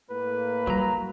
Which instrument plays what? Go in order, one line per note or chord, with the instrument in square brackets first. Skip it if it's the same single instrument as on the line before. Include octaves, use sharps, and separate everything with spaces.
[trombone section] A2 A#3 [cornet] B4
[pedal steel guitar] F#3 A#5 [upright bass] G3